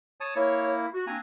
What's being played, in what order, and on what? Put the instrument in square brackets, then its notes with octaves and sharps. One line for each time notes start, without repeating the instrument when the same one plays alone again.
[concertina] C#5 A5 D#6
[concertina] A#3 E4 [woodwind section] C#5
[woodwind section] F#4
[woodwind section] A#3 C4 D4 [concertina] G#5 A#5